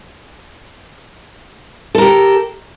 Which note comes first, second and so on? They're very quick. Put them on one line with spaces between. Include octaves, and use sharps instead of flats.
A4 A#4 G4